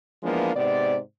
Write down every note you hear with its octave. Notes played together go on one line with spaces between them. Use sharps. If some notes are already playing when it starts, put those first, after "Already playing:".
E3 F3 G#3 A#3 B3 D4
G#2 C3 B3 C5 D5